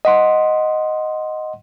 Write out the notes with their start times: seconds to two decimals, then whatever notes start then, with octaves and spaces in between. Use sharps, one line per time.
0.05 D#5 F#5 C6